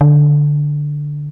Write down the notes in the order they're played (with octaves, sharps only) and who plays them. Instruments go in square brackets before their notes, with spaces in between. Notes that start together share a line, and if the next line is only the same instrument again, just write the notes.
[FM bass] D3